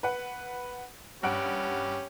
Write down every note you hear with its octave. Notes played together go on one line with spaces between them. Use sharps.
B4 F#5
G2 C#4 G4 F#5 D7